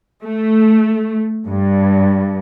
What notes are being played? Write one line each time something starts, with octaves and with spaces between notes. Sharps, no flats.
A3
G2